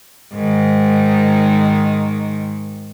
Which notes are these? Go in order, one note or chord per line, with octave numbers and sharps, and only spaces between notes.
G#2 D#3